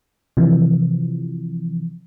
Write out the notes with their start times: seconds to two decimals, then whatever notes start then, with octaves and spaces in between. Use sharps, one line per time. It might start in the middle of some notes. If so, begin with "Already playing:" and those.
0.37 C3 E3 F3